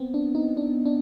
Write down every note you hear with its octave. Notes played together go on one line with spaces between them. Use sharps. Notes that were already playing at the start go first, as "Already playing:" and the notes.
Already playing: B3 C4
D4
D#4
D4
D4